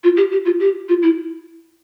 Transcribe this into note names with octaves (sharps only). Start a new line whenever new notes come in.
F4
G4
G4
F4
G4
F4
E4